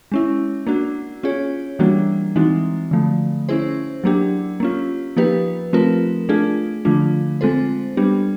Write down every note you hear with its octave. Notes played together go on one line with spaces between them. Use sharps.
G#3 C#4 E4
A#3 D4 F#4
C#4 F4 G#4 C#5
E3 G3 A#3 D4 F#4
E3 G#3 C4 D#4 F#4
D3 F3 A3
C#4 E4 G#4 C5
F#3 A#3 D4 G4
A#3 C#4 F4
F3 A#3 D#4 G4 B4
F3 A3 C4 F4 A#4
A3 D4 F4 G#4
D3 F3 A3 D4 F4
G#3 C4 F4 A4 C5
G3 B3 D4 G4